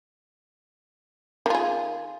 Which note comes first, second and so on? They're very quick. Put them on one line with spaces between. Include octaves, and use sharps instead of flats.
D#3 F4 G#4